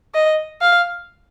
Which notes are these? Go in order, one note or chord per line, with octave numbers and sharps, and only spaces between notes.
D#5
F5